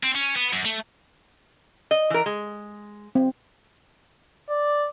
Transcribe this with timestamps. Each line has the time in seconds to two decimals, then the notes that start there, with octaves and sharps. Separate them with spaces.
0.03 C4
0.15 C#4
0.36 B3
0.53 F#2
0.65 A3
1.91 D#5
2.10 E3 A#4
2.26 G#3
3.15 C4
4.50 D5